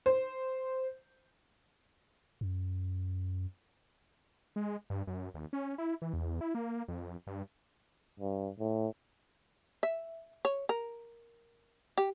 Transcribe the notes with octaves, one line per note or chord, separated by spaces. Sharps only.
C5
F#2
G#3
G2
F#2
D#2
C#4
E4
E3
E2
E4
A#3
F2
G2
G2
A2
E5
C#5
A#4
G4